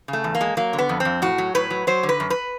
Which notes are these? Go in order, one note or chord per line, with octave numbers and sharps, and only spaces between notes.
C#3
A3
E2
A#3
G#3
F#3 A#3
D3
B3
F2
C4
F2
A2 F#4
F#3
A2 B4
F#3
F#3 C5
D3
B4
F#2
B4